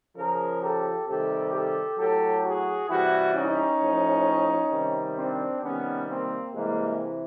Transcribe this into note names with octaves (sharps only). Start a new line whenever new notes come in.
C#3 F3 G#4 A#4
G4 A4
C3 D#3 G3 G4 A4
G4 A4
A2 F#3 G4 A4
F#4 G#4
C3 E3 G3 E4 F#4
C#4 D#4
A2 F3
C3 D#3 G3
C4 D4
C3 D#3 G3 B3 C#4
A#3 C4
C3 E3 G3 G#3 A#3